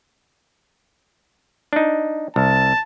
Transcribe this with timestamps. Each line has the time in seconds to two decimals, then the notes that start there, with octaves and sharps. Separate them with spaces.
1.73 D4 D#4
2.36 C2 A5